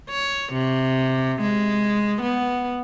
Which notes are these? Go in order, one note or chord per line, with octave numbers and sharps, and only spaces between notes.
C#5
C3
G#3
B3